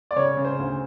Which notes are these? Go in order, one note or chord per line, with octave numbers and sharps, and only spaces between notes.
D5
C#3 C#5
C#3
C5
D2